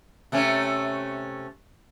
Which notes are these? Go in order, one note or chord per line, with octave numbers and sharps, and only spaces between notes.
C3 A3 C#4